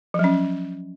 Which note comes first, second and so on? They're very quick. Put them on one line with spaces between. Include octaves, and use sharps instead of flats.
F3 F#3 C#4